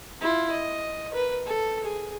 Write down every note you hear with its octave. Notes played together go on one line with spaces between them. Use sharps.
E4 F4
D#5
A#4 B4
A4
G#4